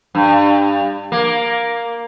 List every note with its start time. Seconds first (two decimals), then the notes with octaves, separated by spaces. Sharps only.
0.15 G2
1.12 A#3